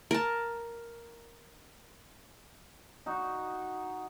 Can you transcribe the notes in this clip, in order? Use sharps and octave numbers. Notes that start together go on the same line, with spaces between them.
A#4 A5
D#4 F#4